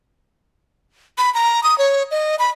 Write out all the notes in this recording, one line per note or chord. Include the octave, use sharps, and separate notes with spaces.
B5
A#5
D#6
C#5
D#5
B5